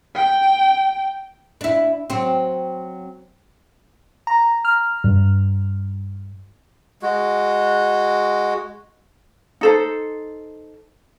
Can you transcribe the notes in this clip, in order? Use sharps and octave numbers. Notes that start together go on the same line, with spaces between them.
G5
D4 E4
F#3 C4
A#5
F6
G2
G#3 F#4
D#4 A4 C5